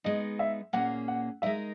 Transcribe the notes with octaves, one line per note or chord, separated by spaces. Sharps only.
G#3 B3 D#4 D#5
E5
A#2 A#3 C#4 G#4 F#5
F#5
G#3 D#4 A#4 E5